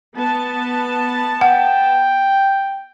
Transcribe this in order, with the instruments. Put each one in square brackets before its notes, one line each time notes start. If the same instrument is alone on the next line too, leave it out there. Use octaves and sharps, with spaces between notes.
[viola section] B3 A5
[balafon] F#5 [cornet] G5